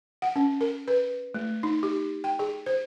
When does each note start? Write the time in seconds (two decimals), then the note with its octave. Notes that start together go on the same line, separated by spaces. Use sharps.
0.22 F#5
0.36 C#4
0.61 A#4
0.88 B4
1.34 A3
1.63 D#4
1.83 G4
2.24 G5
2.39 G#4
2.66 C5